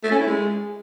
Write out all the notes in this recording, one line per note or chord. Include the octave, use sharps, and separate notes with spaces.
A3
C#4
E4
G#3